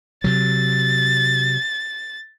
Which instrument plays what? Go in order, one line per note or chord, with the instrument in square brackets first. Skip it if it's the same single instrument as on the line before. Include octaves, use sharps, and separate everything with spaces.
[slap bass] C3 F#3 [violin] A6